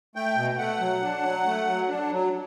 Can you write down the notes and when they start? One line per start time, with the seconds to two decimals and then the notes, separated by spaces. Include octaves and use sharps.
0.16 A3 G5
0.37 B2
0.58 A3 F#5
0.80 F#3
1.02 D4
1.24 F#3
1.46 A3
1.67 F#3
1.89 D4
2.11 F#3